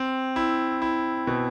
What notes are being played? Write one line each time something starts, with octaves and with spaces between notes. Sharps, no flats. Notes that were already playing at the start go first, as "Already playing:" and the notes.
Already playing: C4
E4
E4
B2